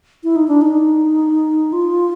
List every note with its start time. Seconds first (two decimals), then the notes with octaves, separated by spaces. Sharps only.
0.24 E4
0.36 D#4
0.48 D4
0.61 D#4
1.73 F4